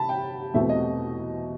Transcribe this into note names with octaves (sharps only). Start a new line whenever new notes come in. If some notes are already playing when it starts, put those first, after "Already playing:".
Already playing: C3 E3 A5 B5
G5
E2 B2 A3 C4 E5
D#5